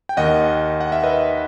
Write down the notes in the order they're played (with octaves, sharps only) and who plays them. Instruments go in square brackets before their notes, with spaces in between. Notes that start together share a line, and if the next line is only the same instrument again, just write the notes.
[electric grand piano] G5
D#2 D#3 D#5 F#5
F#5
E5
B4 D#5